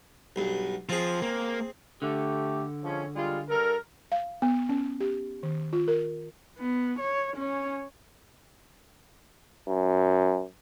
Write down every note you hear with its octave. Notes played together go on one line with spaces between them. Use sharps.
B1 G2
F3 C4 G#4
A#3
D3 A3 G4
F3 G#3 C#4
G3 G#3 F4
G2 A4 A#4
F5
B3
C#4
G4
D#3
F4
A#4
B3
C#5
C#4 C#5
F#2